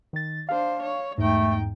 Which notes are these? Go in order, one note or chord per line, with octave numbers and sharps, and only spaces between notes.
D#3 A6
D4 C5 F5
C#5
E2 G#2 A3 D#4 G5